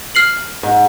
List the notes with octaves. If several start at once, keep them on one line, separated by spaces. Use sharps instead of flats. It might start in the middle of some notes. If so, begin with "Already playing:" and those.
F6 C7 F#7
G#2